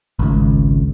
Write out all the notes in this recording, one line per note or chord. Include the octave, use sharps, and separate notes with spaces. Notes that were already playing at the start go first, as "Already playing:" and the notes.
G#1 C#2